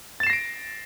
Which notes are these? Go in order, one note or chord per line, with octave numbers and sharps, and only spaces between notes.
A6 A#6 C7 D7 E7